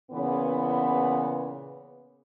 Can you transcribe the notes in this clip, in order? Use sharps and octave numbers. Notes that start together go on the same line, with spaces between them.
A#2 C#3 E3 B3